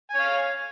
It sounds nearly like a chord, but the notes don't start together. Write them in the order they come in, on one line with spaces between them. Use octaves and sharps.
G#5 C#5 F5